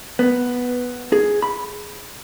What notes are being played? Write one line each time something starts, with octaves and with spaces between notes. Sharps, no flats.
B3
G#4
B5